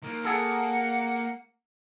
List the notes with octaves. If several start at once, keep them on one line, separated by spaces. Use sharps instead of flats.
D#3 A#3
A#3 G#4 A4 F#5